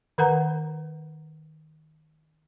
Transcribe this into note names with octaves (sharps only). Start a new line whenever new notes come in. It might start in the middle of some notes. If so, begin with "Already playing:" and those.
D#3 A#4 B4 F#5 A#5